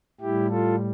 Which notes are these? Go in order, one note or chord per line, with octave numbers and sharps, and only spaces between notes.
A2 G3 E4 G4
F4 A4